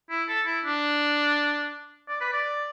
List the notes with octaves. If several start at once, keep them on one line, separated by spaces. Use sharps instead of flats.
E4
A4
E4
D4
D5
B4
D5